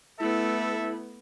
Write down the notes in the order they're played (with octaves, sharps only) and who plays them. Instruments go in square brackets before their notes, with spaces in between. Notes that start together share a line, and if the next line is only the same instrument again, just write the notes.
[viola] A3 B3 [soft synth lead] E4 [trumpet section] A4 E5